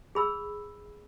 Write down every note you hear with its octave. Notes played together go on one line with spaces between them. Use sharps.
G#4 B5 E6